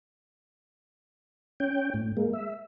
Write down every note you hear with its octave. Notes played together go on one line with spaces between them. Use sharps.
C#4 G5
A2
G#3 A#3
E5